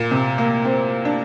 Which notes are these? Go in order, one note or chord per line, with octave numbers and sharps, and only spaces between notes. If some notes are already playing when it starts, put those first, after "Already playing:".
Already playing: A#2
C3
A#3
C4
D4